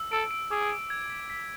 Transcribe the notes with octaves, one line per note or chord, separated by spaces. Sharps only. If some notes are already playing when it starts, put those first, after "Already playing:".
Already playing: E6
A4 D7
D7
G#4 D6
D7
G#6
B6
B6